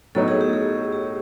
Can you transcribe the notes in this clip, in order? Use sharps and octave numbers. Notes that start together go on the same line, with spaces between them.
A2 F#3 B3 D#4 A4
G#4
G4
G#4
G4